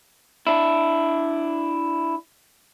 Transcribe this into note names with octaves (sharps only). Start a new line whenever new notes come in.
D4 E4